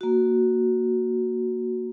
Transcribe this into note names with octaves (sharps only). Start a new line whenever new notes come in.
A#3 F#4